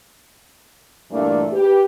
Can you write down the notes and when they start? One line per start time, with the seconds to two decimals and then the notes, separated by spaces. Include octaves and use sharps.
1.10 G2 A#2 E3 A3 A#3 D4
1.52 G4 B4